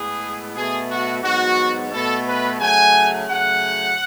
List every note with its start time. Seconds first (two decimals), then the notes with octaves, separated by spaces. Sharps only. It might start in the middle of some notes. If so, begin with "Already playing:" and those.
Already playing: A2 G#3 B3 G#4
0.56 B2 A3 G#4
0.90 F#4
1.23 G#2 F#3 B3 F#4
1.92 B2 A3 A4
2.27 B4
2.60 C#3 F#3 A3 G#5
3.29 C#3 F#3 A3 F#5